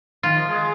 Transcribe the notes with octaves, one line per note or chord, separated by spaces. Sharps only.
D#3 F4
F3
G#3